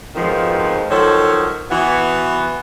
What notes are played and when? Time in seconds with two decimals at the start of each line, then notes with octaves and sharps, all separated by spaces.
0.15 F2 G#2 B2 D#3 F3
0.90 D#3 F3 F#3 D#4 A4 C#5
1.71 E3 B3 F#4